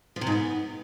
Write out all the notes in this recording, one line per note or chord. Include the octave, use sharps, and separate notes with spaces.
F3
C3
G#2
B3